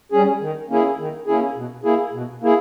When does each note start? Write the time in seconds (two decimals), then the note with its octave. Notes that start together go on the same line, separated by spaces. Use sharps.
0.12 G3 C#4 G#4
0.41 D#3
0.70 A#3 C#4 E4 G#4
0.99 D#3
1.26 A#3 C#4 E4 G#4
1.55 B2
1.84 A#3 E4 G#4
2.13 B2
2.42 A#3 E4 G#4